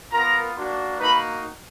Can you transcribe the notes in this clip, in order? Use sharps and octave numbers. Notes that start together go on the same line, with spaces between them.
B3 F4 A#4 A#5
A#3 D4 F#4
A#3 D#4 F#4 B4 B5